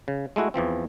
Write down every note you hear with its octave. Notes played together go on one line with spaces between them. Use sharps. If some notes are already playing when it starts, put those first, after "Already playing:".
C#3
G#3 A3 E4 F#4
E2 E3 F3 C4